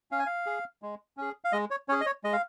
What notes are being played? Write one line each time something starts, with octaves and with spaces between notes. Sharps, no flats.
C#4 F5
G#5
F5
G#4
G#3
C#4 G#4
F5
G#3 D#5
C#5
C#4 G#4 C#5
D#5
C#5
G#3 D#5
F5